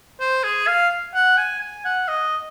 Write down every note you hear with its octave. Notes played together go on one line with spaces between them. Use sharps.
C5
G#4
F5
F#5
G#5
G#5
F#5
D#5